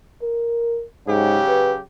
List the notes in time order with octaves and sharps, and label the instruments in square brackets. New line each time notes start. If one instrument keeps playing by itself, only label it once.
[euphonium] A#4
[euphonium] G#2 [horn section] C#3 F#3 G4
[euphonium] B4